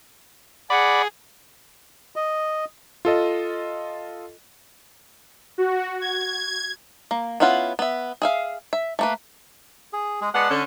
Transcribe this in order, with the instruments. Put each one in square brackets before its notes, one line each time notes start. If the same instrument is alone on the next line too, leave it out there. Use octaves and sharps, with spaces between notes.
[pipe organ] G#4 [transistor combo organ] D5 B5 [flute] F#5
[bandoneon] D#5
[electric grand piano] F4 A4 D#5
[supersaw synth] F#4
G#6
[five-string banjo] A#3
B3 C#4 E4 F4 F#5
B3 E5
G#4 E5 F5
E5
A3 A#3 B4
[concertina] G#4
G#3 G#4
[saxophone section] G#3 B3 F#5 [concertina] D5 A5
[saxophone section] D3 C#4